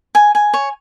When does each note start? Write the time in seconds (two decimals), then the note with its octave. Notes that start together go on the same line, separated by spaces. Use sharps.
0.15 G#5
0.35 G#5
0.54 C#5